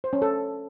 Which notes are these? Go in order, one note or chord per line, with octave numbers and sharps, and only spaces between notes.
C5
C#4
A4